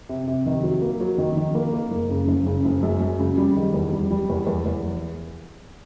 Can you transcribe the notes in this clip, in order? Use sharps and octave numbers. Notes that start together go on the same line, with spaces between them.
C3
C3
D#3
F#3
A#3
F#3
D#3
D#3
A#3
A#3
F#1
C#3
F#1
C#3
F#1
F#2
F#2
C#3
G3
D#3
E2
G3
G3
E2
E2
E2